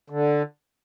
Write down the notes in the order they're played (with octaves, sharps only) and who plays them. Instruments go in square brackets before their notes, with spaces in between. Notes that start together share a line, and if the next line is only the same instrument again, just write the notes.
[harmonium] D3